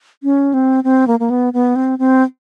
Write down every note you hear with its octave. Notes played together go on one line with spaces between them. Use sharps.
C#4
C4
C4
A#3
A#3
B3
B3
C4
C4